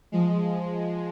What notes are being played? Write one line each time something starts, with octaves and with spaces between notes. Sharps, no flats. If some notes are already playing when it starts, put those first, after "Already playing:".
F3 G#3